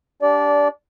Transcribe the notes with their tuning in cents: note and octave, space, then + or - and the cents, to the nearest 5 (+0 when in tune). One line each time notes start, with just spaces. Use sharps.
D4 -25 G4 +0 D5 -15